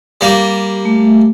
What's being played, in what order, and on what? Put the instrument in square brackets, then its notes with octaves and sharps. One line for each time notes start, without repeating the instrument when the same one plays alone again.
[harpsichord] G3 A#3
[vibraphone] A3